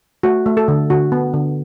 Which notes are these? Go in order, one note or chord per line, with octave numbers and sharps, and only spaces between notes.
A3 F#4
A3
A4
D3
D3 F#4
B3
D3